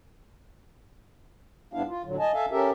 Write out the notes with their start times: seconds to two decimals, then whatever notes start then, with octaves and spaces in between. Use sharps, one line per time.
1.74 G#2 G3 B3 D4 E4 F5
1.88 F4
2.05 A2 D3 F#3
2.19 D#5 G#5 A5
2.34 A4 E5 F5 G#5
2.51 C#4 G4 A4 A#4 E5